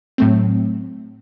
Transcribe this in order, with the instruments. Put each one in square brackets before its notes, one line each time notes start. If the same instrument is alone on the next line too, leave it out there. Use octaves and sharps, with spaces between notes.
[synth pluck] A2 F#3 A3 C4